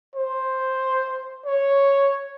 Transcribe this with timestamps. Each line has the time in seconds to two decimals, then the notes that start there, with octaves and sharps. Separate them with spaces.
0.16 C5
1.46 C#5